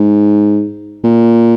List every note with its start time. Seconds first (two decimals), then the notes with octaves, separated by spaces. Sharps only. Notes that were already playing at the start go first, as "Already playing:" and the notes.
Already playing: G#2
1.04 A#2